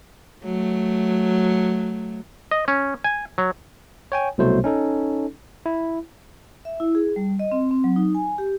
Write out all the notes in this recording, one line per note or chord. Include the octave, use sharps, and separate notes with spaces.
F#3 A3
D#5
C#4
G#5
F#3
C#5 G5 G#5
C2 B2 F#3 A3 C5
C#4 D#4 A4
E4
E5
E4
G#4
G3
D#5
C4
C4
F#3
D#4
G#5
G4